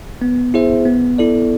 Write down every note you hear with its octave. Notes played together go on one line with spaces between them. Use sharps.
B3
E4 G#4 C5 E5
B3
E4 A4 D5